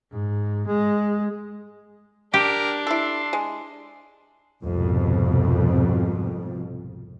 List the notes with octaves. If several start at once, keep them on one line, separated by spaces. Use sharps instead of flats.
G#2
G#3
D4 G4 A#4
E4 A4 C6
G#3
C2 F2 G#2 B2